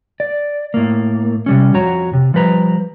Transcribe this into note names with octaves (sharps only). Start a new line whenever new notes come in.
D5
A2 A#3
C3 G3 C#4
F2 F#4 C#5 A#5
C3
F3 G3 B4 A#5